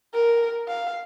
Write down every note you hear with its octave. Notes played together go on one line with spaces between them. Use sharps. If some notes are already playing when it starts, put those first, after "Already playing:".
A#4
F5